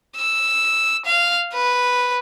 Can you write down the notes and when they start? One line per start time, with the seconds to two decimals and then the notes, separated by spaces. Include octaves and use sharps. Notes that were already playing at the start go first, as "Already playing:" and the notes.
0.16 E6
1.06 F5
1.53 B4